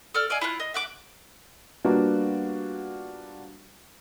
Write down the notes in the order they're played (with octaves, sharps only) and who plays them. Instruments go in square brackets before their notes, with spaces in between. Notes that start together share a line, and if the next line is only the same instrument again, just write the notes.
[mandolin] A4 D5 E6 F6
D5 D#5 F5 G#5
E4 F4 B5 F#6
D#5
E5 F#5 D6
[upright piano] G3 A#3 B3 D4 F4 F#4